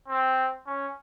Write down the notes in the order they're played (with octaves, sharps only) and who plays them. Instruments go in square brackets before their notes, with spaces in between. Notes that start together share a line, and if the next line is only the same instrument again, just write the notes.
[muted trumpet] C4
C#4